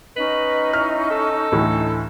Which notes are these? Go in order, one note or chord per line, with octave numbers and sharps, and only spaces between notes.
C#4 D#4 B4 D#5
E4 F6
A4
D2 A2 E3